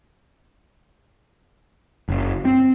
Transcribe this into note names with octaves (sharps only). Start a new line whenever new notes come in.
F#1
C4